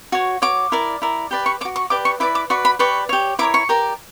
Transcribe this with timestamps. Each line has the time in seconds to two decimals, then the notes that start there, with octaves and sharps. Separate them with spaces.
0.12 F#4 C#5
0.42 F#4 C#5 D6
0.72 E4 A#4 D5
1.02 E4 A#4 D5
1.31 G4 B4 D5
1.46 C#6
1.61 C#5 D6
1.65 F#4
1.76 C#6
1.90 G4 B4 D5 D6
2.05 C#6
2.20 E4 B4 D5 D6
2.35 D6
2.50 F#4 B4 D5 C#6
2.65 B5
2.79 G4 B4 D5 C#6
3.09 G4 C#5
3.39 E4 A#4 C#5 D6
3.54 C#6
3.69 G4 A#4 D5